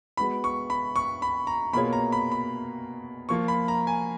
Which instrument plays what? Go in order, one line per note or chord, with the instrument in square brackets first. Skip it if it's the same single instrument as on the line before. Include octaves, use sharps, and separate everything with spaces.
[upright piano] G#3 B3 F#4 [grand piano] B5
[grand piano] C#6
B5
C#6
B5
A#5
[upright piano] B2 A#3 F4 G#4 C#5 [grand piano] B5
[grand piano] A#5
B5
B5
[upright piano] F3 A#3 F4 [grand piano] C#6
[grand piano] B5
A#5
G#5